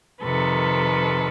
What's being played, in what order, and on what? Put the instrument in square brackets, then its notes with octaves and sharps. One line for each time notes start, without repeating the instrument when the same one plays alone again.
[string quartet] F2 C3 D#3 A4 B4